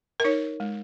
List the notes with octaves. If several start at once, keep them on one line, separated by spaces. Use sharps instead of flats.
A#4
D#4 C#5
G#3